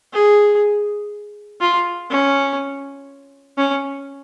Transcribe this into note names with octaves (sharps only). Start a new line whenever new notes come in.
G#4
F4
C#4
C#4